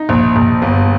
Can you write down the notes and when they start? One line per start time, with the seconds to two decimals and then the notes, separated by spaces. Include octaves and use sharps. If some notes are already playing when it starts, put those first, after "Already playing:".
Already playing: D#4
0.09 A#1
0.36 A#1
0.62 G1